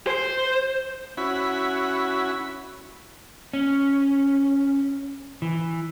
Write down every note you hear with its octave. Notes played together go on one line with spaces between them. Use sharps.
C5
C#4 E4 F#4 B5
C#4
E3